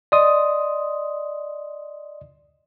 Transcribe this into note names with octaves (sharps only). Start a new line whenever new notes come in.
D5 D#5 C6 D#6